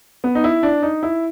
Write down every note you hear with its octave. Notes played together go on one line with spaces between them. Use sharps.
B3
D#4
E4
D4
D#4
E4